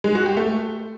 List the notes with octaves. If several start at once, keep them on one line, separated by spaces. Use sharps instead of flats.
G#3
F#4
G4
A3